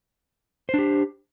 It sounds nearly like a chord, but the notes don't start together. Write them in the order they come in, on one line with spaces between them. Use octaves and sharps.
C5 D4 G4